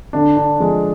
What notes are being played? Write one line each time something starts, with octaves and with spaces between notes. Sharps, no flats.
D3 D4
D4
F3 G#3